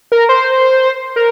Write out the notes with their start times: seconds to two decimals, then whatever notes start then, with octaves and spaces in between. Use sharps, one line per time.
0.12 A#4
0.29 C5
1.16 A#4